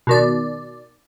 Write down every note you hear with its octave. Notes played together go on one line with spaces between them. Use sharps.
B2 D#3 D5